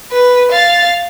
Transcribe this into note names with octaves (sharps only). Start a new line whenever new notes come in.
B4
F5 A6